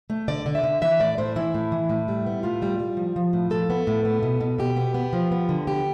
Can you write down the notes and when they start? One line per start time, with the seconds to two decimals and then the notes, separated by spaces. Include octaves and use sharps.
0.10 A3
0.28 D3 D5
0.46 D3
0.55 E5
0.63 D3
0.81 E3 E5
1.00 A2 D5
1.18 A2 C5
1.36 E3 E4
1.54 A2
1.72 E3
1.90 A2
2.08 G3
2.26 B3
2.43 A2 F4
2.62 G3
2.79 G3
2.97 F3
3.16 F3
3.33 A2
3.51 F3 A4
3.70 B3
3.87 A2
4.05 B3
4.23 B2
4.41 B2
4.58 B2 G4
4.76 B3
4.94 B3
5.13 F3
5.31 B3
5.49 D3
5.67 B3 G4